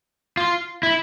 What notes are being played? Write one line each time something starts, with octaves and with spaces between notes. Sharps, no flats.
F4
E4